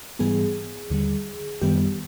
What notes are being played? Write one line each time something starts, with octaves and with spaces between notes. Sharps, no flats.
G#2 E3 G3 B3 G#4
D#2 D3 G3
F#2 D#3 G3 B3 G4